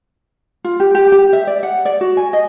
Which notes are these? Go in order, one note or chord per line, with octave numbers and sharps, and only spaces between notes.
F4
G4
G4
G4
E5
D5
F#5
D5
F#4
G#5
D#5